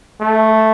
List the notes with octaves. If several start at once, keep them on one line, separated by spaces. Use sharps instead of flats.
A3